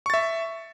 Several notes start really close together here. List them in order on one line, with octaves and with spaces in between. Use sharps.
C#6 A6 E5